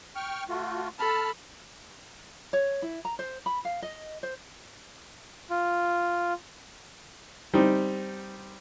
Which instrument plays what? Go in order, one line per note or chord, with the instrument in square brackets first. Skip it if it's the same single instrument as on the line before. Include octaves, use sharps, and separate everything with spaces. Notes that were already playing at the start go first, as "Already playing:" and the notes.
[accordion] G5 C#6 F6
A3 F4 F#4
[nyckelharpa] A4 B5 [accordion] A5 F6
[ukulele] C#5
E4
A#5
C5
B5
F5
D#5
C5
[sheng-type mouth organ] F4
[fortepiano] G3 C4 D#4